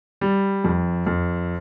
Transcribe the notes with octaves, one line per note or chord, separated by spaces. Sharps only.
G3
F2
F2